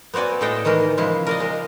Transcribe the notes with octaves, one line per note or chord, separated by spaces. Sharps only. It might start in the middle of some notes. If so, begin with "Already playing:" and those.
B3 C4 F#4 D5 G#5
A2 G#3 G#4 A4 D#5 G5
D#3 E3 G#3 A#4
C#3 F3 G#3 E4
A#4 D5 D#5
G#3